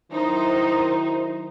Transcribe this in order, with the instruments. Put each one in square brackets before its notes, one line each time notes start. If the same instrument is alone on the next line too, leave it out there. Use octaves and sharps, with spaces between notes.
[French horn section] D#3 F#3 E4 [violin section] D#4 C5